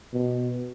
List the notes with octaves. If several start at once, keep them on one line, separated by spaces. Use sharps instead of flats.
B2